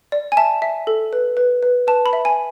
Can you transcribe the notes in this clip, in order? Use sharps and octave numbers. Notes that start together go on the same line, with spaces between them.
D5
G#5
E5 A5
E5
A4
B4
B4
B4
B4 A5
B5
E5
G#5